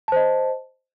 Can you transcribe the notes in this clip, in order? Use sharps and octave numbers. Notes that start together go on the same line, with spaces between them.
C5 D#5 A5